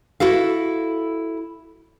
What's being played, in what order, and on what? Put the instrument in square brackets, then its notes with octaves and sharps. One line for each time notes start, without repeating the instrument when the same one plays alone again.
[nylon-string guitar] E4 F#4 A4 F5